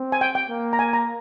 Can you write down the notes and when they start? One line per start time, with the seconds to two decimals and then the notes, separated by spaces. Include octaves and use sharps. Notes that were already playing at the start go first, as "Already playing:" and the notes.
Already playing: C4
0.12 G#5
0.21 G5
0.35 G5
0.50 A#3
0.73 A#5
0.79 G#5
0.93 A#5